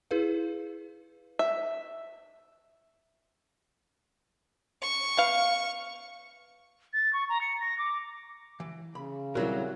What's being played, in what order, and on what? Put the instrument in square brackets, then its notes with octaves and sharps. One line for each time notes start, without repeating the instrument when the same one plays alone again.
[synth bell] E4 G#4 B4 F5
[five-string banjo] E5
[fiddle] C#6
[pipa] B3 F5
[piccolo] A6
C#6
A#5
C#7
A#6
D6
[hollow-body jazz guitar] E3
[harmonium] C#3 [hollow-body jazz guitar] B5
[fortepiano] E3 G3 C4 [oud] F#3 F#4 [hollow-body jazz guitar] A#4 E5